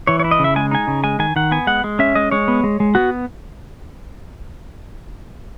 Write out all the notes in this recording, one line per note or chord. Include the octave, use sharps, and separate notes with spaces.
E3 C#5
C#5
E4
D#5
C#3
E5
G#3 G#5
D#4 G#5
C#3
G#3 G#5
D#3 G#5
D#3 F#5
B3 G#5
G#3 F#5
G#3
C#4 E5
G#3 D#5
G#3 C#5
B3
G#3
G#3
B3 F#4